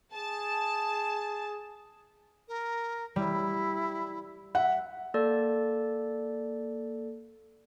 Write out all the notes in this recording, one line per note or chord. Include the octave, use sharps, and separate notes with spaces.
G#4 A5
A#4
G3 E4
E5 F#5
A#3 A4 D5